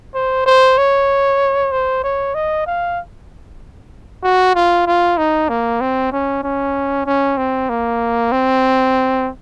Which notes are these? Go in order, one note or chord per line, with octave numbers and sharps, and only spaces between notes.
C5
C5
C#5
C5
C#5
D#5
F5
F#4
F4
F4
D#4
A#3
C4
C#4
C#4
C#4
C4
A#3
C4